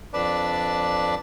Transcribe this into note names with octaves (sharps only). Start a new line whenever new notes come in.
F2 D4 B4 D5 A5